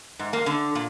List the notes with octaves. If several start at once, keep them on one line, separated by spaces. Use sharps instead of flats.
G#2
A#3
D3
A#2